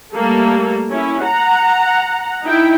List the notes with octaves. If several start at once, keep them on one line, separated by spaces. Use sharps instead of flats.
G3 A3 A#3 A4
C#4 E4
F#5 A#5
D#4 E4 G5